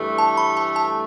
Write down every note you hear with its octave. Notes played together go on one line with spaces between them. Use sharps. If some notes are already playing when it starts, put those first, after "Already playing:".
Already playing: G2 E3 A3
A5
B5
A5
A5